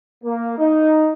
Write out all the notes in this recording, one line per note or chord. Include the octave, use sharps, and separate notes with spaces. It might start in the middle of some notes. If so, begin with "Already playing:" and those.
A#3
D#4